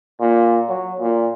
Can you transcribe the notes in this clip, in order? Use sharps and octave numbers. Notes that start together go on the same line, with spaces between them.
A#2
F#3
A#2